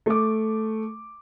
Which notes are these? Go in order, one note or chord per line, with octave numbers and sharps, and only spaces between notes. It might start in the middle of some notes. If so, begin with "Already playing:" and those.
A3 D6